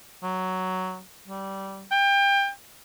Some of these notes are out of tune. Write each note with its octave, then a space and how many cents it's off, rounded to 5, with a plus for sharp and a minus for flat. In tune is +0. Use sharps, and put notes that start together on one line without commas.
F#3 +5
G3 -15
G5 +25